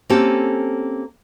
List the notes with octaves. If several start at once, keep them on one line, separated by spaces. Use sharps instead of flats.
A#3 C4 C#4 G4 A4